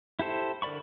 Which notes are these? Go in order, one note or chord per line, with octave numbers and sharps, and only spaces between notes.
E4 G4 A4 C5
D3 A#4 D5 B5 C#6